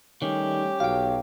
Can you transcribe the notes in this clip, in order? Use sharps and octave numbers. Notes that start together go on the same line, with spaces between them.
D#3 G3 A3 C#4 G4
B1 F#3 F5 G5